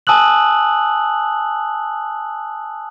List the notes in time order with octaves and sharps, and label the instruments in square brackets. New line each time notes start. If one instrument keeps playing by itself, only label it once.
[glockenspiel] G#5 A5 D#6 E6 F#6 F#7